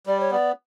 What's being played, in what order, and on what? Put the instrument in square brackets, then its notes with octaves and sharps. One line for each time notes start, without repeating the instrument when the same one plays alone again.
[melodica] G3 [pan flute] D5
[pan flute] C#5
[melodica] B3 [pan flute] D5